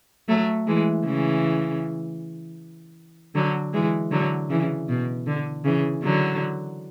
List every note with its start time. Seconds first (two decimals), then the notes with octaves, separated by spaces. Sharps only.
0.28 F#3 A3
0.67 E3 G#3
1.05 C#3 E3
3.35 D3 F#3
3.73 E3 G#3
4.11 D3 F#3
4.49 C#3 E3
4.89 B2
5.27 D3
5.65 C#3 E3
6.03 D3 F#3